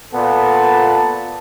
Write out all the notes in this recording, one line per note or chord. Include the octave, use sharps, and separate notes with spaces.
A#2 B3 A4 A5